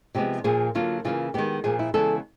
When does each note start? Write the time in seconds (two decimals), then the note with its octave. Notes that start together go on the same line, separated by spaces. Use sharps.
0.15 C3 F3 G#3 B3 G4
0.44 A#2 F3 A#3 G#4
0.75 D3 F#3 A#3 F4
1.05 C#3 E3 G3 A#3 F4
1.34 D#3 G#3 B3 G4
1.64 A#2 F3 A#3 G#4
1.79 E4
1.94 C#3 E3 G#3 B3 A4